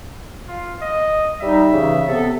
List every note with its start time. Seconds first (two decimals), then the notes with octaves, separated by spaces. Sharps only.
0.49 F4
0.82 D#5
1.42 G3 D#4 E5
1.73 C#3 E3
2.06 C3 B3 A4